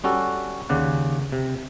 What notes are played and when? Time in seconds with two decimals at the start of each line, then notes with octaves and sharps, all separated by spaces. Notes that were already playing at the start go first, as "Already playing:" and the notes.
0.04 G3 C#4 F#4 A4
0.69 D#2 C#3 D5 F#5
1.32 C3